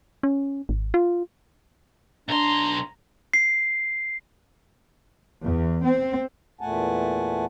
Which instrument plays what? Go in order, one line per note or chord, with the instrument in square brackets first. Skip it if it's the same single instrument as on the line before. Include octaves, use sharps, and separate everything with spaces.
[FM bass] C#4
G#1
F4
[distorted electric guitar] B1 C6 [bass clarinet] D4 [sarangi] A#5
[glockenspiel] C7
[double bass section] E2
C4
[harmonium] E2 A#2 A3 F#5 G#5 A5